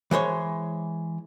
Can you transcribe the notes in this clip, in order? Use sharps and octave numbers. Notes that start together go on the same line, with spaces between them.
E3 G#3 C5 C#5